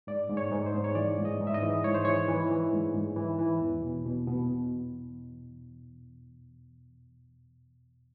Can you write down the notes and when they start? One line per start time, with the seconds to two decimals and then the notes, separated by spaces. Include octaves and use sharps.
0.07 G#2 D5
0.30 G#2
0.37 C#5
0.52 G#2
0.66 C5
0.74 G#2
0.84 C#5
0.95 E3 D5
1.18 G#2
1.25 D#5
1.40 G#2
1.47 E5
1.54 D#5
1.63 E3
1.84 G#2 C#5
1.94 C5
2.05 E3 C#5
2.28 E3
2.51 E3
2.73 G#2
2.95 G#2
3.16 E3
3.39 E3
3.60 E2
3.83 B2
4.05 B2
4.27 B2